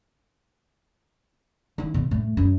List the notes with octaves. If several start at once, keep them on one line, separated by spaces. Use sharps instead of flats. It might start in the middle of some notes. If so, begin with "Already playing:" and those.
D#3 E4
B2
A2 A3
F#2